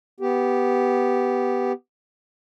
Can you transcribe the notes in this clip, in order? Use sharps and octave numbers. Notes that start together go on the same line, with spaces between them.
B3 G4